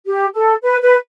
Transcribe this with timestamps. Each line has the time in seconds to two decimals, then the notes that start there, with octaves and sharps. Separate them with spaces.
0.06 G4
0.33 A4
0.62 B4
0.81 B4